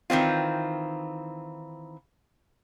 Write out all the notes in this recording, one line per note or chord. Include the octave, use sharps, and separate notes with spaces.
D#3 E3 C4 F4